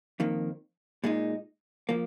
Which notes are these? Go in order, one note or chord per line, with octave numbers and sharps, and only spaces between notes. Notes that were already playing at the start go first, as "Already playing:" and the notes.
F2 D#3 A#3
A#2 G#3 D#4
F3 A#3